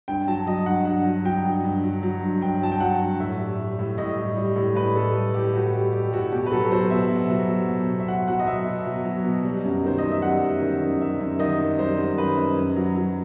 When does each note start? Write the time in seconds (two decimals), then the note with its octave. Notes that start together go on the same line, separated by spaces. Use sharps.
0.08 G2 G5
0.28 F#3 A5
0.46 F#3 D#5
0.66 G2 F#5
0.85 G2 F#5
1.05 F#3
1.24 F#3 G5
1.44 G2
1.64 G2
1.84 F#3
2.03 F#3
2.22 G2
2.41 G2 G5
2.62 F#3 A5
2.72 G5
2.80 F#3 F#5
3.01 G2
3.20 A2 E5
3.40 G3
3.58 G3
3.79 A2
3.98 A2 D#5
4.17 G3
4.37 G3
4.56 A2
4.75 A2 B4
4.95 G3 A4
5.15 G3
5.34 A2 G4
5.54 A2 F#4
5.73 G3 G4
5.93 G3 G4
6.13 A2 F#4
6.32 B2 G4
6.46 B4
6.52 F#3 A4
6.71 F#3 C5
6.90 B2 E5
7.10 B2
7.30 F#3
7.49 F#3
7.69 B2
7.88 B2
7.99 E5
8.08 F#3 F#5
8.28 F#3 F#5
8.39 D#5
8.46 B2 E5
8.67 B2
8.86 F#3
9.05 F#3
9.24 B2
9.44 G3
9.64 F#2
9.84 D#3 C5
9.98 F#2 D#5
10.11 E5
10.22 G3 F#5
10.42 F#2
10.62 D#3
10.81 F#2
11.00 G3 E5
11.20 F#2
11.39 D#3 D#5
11.59 F#2
11.78 G3 C5
11.97 F#2
12.17 D#3 B4
12.36 F#2
12.56 F#2
12.76 F#3
12.96 F#3